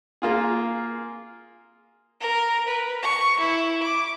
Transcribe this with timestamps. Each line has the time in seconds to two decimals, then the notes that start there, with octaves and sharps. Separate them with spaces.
0.22 A#3 F4 G#4
2.20 A#4
2.67 B4
3.02 C#6
3.40 E4
3.83 D6